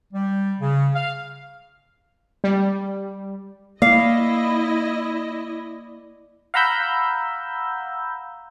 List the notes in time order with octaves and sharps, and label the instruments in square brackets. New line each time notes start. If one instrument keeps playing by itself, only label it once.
[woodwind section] G3
C#3
F5
[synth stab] G3
[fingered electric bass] A#3 [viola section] E4 D#5 [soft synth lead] D5 [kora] F5
[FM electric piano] F5 F#5 A#5 B5 E6 G6